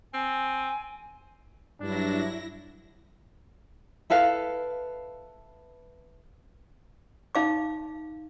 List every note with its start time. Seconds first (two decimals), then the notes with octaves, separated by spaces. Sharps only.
0.14 C4 G#5
1.81 G2 F#3 D4 E4 A#6
4.10 E4 A4 B4 F5
7.35 D#4 F5 D6